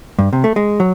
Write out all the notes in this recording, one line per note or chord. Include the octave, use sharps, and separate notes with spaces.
G2
C3
A3
G#3
F#3